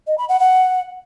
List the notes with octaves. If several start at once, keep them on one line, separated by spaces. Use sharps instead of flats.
D#5
B5
F#5
F#5